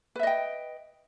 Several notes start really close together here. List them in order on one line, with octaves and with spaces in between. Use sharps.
B4 E5 D#5 G5